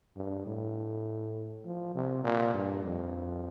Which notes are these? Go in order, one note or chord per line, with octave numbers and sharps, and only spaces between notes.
G2
A2
F3
C3
A#2
G2
F2